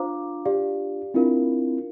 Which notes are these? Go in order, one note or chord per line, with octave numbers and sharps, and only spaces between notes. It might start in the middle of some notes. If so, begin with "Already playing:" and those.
Already playing: D4 F4 C5 F5 A#5 D6
G4 D5 F5
C4 D4 E4 F4 A#4 F5